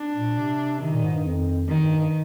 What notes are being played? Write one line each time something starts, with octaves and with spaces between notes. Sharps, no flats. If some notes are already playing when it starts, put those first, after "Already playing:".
Already playing: D4
A#2
C3
C3 D#3
A#2
G#2
G2
F2
D#3
G2
G2